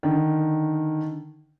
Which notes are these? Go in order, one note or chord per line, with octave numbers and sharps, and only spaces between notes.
D3 D#3